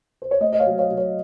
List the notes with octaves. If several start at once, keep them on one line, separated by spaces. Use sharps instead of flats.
C5
C#5
A3 C5 D#5
D#5
C#5 F5
F#3
C#5 F5
F#3
C#5